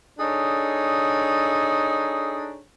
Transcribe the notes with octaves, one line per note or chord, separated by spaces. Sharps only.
D4 D#4 G#4 A4 C#5